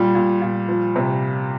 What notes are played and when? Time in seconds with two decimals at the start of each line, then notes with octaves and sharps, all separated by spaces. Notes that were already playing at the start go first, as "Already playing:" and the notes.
Already playing: A#2 G3
0.15 A#2
0.42 A#2
0.69 F3
0.96 C3